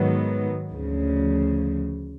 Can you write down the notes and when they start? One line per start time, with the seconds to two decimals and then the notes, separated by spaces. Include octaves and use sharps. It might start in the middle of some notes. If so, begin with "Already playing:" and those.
Already playing: G#2 D#3 F#3 B3
0.71 D2 C#3 F3